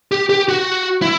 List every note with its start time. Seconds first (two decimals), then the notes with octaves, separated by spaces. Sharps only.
0.12 G4
0.29 G4
0.48 F#4
1.02 E4